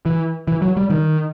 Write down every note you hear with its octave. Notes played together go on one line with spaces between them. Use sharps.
E3
E3
F#3
G3
D#3